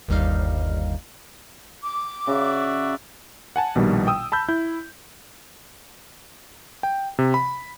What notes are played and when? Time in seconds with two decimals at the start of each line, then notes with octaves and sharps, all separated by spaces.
0.08 G1 D#2 G3 D#4 F5
1.84 D6
2.27 C#3 F#4 D5 E5
3.56 F#5 G#5 A5
3.75 A#1 B2 D#3 G3
4.07 G5 D#6 E6
4.32 A5 B5 E6 G6
4.48 E4 G6
6.83 G5
7.19 C3
7.34 B5